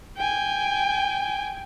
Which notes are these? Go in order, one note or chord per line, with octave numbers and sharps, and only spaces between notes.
G5 G#5